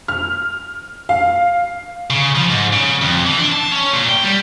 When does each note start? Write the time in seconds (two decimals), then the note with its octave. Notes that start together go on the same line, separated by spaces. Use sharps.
0.08 F6
1.09 F5
2.10 C#3
2.35 F3
2.50 G#2
2.72 C#3
3.02 F2
3.26 E3
3.39 D4
3.52 A5
3.71 C#4
3.94 A#2
4.09 G5
4.23 G3